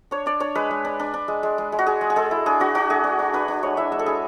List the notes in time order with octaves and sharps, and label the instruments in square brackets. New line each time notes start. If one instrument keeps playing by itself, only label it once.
[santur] D4 C#5
D4 D5
D4 C#5
G#3 B4
G#3
D4
D4
D4
G#3
G#3
G#3
G#3
F#4
G#3 G#4
G#3
G#4
G#3 A4
E4
D4 G#4
D4 F#4
D4 F#4
A3 G#4
D4
D4
D4 B4
D4
G#3 C#5
E4 E5
G#3 E5
A4
E4 G#4